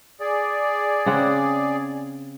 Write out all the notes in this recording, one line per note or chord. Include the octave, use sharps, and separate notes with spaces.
G#4 D5
C#3 C4 F#5